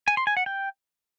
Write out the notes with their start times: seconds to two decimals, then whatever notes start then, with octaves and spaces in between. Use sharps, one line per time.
0.08 G#5
0.17 C6
0.27 G#5
0.37 F#5
0.46 G5